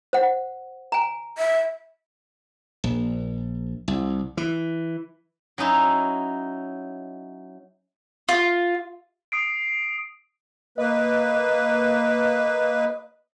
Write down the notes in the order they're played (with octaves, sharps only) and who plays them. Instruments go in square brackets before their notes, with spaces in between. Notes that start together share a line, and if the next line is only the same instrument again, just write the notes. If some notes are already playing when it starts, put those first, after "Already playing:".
[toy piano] C5 F#5
G#5 A#5
[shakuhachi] E5
[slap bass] A#1
C2
E3
[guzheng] F#3 C#4 D#4 E4
[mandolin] F4
[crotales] D#6 C7 D7
[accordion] A#3 B4 [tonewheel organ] D#5